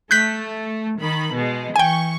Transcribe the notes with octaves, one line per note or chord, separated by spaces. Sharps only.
A3 F#6 G6 B6
D#3 B5
B2 G#3
E3 G5 G#5 C#6